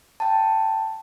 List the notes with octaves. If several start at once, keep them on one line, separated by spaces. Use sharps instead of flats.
G5 A5